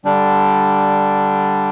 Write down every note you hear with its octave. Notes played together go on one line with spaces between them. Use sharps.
D3 G3 D4